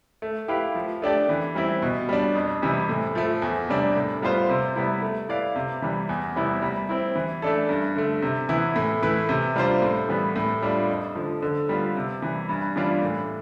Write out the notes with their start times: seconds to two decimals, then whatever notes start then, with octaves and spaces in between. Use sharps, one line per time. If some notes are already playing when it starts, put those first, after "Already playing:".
0.22 A3
0.48 E4 G4 B4 F5
0.75 F3
1.02 A3 D4 G4 D5
1.29 E3
1.55 G3 C4 E4
1.82 B2
2.09 G3 D4
2.35 F2
2.62 C3 E3 G3
2.89 A2
3.15 F3 A3
3.42 E2
3.69 C3 G3 D4
3.95 A2
4.22 G3 B3 F4 C5
4.49 C3
4.76 G3 B3 E4
5.02 A3
5.28 E4 B4 D5 F5
5.56 C3
5.82 E3 G3
6.09 E2
6.36 C3 G3 B3 E4
6.62 G3
6.89 C4 E4
7.16 E3
7.42 A3 D4 A4
7.69 G2
7.95 D3 A3
8.22 C3
8.49 E3 B3 E4
8.76 A2
9.02 E3 A3 E4 B4
9.29 C3
9.56 G3 D4 F4 C5
9.82 A2
10.09 E3 G3 B3
10.36 A2
10.62 G3 D4 F4
10.89 F2
11.16 D3 F3
11.42 D3
11.69 G3 B3 F4
11.96 C3
12.22 E3 G3
12.49 G2
12.76 E3 G3 D4 F4
13.02 A2